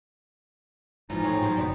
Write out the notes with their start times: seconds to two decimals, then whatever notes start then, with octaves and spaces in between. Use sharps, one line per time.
1.10 G#2 E3 F3 D#4 F4
1.24 A2 C4 G#4
1.43 F3 F#3 C5
1.57 F#1 B3 D4